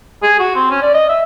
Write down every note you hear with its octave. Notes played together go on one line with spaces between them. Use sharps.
G#4
F#4
C4
C#4
D5
D#5
E5